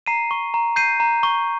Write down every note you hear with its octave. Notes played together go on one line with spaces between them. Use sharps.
A#5 C7 D#7
C#6
A#5
G6 C7 D#7
A#5
C#6